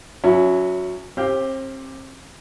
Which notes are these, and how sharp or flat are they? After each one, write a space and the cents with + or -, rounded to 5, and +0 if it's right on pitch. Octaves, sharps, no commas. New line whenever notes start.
F#3 -20 C#4 +15 E4 +5
C4 +35 G4 +5 F5 +0